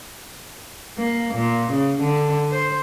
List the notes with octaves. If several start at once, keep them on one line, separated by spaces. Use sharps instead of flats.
A#3
A#2
C#3
D3
C5